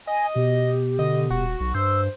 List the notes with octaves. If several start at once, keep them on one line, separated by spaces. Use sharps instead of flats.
D#5 G#5
B2 G4
D3 D#5
D#1 F#4
B1
G2 C5 E6